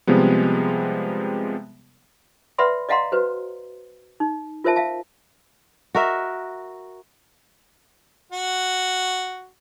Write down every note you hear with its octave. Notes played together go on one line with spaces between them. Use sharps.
C3 F3 G3 G#3 B3
B4 D5 E5 F#5 B5 C6
D5 D#5 F5 F#5 A#5 C6
F#4 B4 C5
D#4
F4 A#4 C5 E5 A5
E5 F5 A5
F#4 A#4 E5
F#4